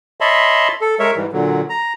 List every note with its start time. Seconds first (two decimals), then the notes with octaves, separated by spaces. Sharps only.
0.21 C#5 D#5 E5 A5 B5 C6
0.81 A4
0.99 G#3 A#4 C#5 E5
1.16 G#2 E3 G3
1.32 A#2 D3 F#3
1.69 A#5